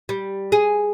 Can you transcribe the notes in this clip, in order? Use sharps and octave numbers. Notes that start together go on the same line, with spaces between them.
G3
G#4